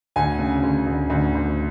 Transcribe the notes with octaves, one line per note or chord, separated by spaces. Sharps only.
D2 G#5
C#3
D2
D2
D2
D2